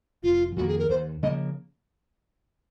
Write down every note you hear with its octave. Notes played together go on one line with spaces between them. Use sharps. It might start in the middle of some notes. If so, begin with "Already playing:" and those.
F1 F4
F2 D#3 A#3 F#4
G#4
A#4
D#2 C5
C#3 F3 A#3 D#5